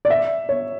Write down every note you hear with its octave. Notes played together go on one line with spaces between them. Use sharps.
D5
E5
C#5